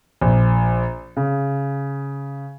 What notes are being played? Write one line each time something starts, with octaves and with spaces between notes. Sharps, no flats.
A#1
C#3